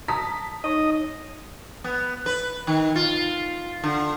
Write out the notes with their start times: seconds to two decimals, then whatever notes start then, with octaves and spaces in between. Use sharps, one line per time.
0.08 A5 A#5 D#6 B6
0.64 D#4 C#5 D#5
1.84 B3
2.26 B4
2.67 D#3
2.95 F4
3.84 D3